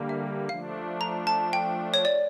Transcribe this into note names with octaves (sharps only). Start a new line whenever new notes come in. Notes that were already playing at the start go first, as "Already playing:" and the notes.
Already playing: D3 G3 A#3
E5
F3 A3 D4 F5
A#5
A5
G5
C#5
D5